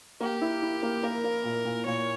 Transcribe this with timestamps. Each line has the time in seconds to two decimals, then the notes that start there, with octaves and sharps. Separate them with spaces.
0.21 A#3 G4
0.41 E4
0.62 E4
0.83 A#3
1.03 A#3 A#4
1.24 A#3
1.44 A#2
1.65 A#2
1.86 A#2 C#5